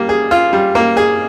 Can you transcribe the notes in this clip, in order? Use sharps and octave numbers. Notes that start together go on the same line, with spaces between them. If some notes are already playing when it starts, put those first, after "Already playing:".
Already playing: G3 A#3
G#4
F4
G3
A#3
G#4